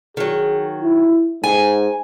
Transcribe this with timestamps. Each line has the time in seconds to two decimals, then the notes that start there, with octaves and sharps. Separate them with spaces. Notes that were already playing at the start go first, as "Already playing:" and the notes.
0.17 D#3 F#3 G#4
0.83 E4
1.44 G#2 G#5